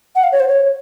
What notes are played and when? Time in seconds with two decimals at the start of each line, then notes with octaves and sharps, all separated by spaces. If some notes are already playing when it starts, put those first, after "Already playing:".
0.15 F#5
0.24 F5
0.32 C#5
0.40 C5
0.49 C#5